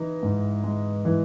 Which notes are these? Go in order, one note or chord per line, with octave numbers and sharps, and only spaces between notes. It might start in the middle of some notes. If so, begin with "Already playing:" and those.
Already playing: E3 D#4
G#2
G#3
E3